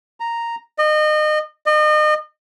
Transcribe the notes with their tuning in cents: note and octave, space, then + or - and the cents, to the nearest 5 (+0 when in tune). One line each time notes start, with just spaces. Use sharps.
A#5 -5
D#5 -30
D#5 -35